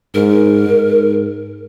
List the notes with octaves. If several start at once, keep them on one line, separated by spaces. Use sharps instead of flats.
G#2 A#4
G#2